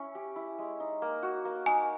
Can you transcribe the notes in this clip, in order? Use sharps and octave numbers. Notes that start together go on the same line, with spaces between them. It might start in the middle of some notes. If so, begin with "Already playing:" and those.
Already playing: C#4 E4
G4
E4
G#3
D#4
A#3
F#4
A#3
D#4 G#5